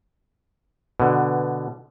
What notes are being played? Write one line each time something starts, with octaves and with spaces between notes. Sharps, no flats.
B2 D3